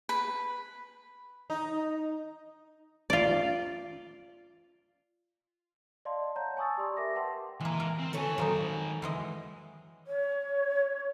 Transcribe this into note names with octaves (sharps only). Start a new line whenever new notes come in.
B4
D#4
F4 D5
D5 D#5 F5 A5 C6
C#5 F#5 A5 A#5 G6
G#5 A5 C#6 D#6 E6 A6
G4 D5 C6
A#4 E5 D6 A#6
B4 F#5 G5 A5 C6
E3 G#3 A#3
A#4
C4
D#3 A4 B4 C#5 G#5
F3 F#3 A#3 D#4
E3 G#3 D#5
C#5